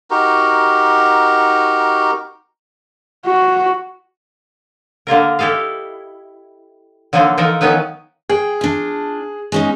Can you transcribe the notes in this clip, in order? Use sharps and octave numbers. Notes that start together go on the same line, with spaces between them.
D#4 F#4 G4 A#4
F#4
D3 A#3 F4 A#4
E4 G4 A4 D#5 F5
D3 F3 F#3 A#3 D#4 A4
E3 F3 D#4 A4 A#4
D#3 F#3 B3 C#4 D#4 B4
G#4 G5
D4 F4
G#3 C#4 D#4